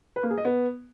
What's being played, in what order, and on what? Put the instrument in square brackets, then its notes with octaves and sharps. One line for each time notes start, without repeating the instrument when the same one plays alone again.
[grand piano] B4
A#3
G#4
D#5
B3